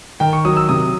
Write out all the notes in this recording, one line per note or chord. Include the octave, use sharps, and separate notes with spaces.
D#3 G5
C#6
F#3 D#6
E6
C3 D#6